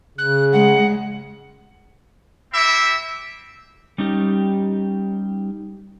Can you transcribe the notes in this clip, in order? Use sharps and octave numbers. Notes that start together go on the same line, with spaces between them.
C#3 F#6
G#3 F#5
C4 E4 G4 E5
G3 C#4 D#4 G4